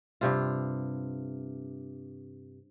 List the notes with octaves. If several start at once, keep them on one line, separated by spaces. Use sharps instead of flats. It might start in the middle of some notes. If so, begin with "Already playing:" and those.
G2 C3 F4